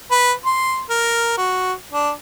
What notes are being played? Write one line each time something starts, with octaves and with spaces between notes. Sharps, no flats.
B4
C6
A#4
F#4
D4